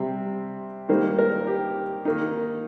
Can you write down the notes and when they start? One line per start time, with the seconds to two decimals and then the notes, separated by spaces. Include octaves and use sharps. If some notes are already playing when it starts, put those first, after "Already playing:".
Already playing: C3 G3 C4
0.89 D#3 G3 A#3 D#4 C5
1.18 A#4
1.47 G4
2.05 D#3 A#3 D#4